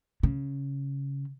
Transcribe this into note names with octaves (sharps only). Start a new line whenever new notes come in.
C#3